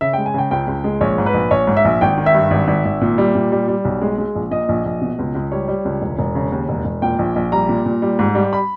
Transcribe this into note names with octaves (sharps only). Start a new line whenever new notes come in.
C#3 E5
G#3 G5
G#5
C#3 G5
C#2 G5
C#2
G#3
A#1 C#5
G#2
B4
A#1
A#1 C#5
G#2
E5
A#1
G#1 G5
D#3
E5
G2
G#1
G#1
G#1
A#2
G3
A#2
G3
G3
B1
G#3
G#3
A#1
A#2 D#5
A#1
A#1
B2
C#2
C#2
G3 C#5
G3
C#2
E1
E1
C#3
D#2
E1
E1
A#2 G5
A#1
A#1
G3 A#5
A#2
A#2
G3
G#2
G3
B5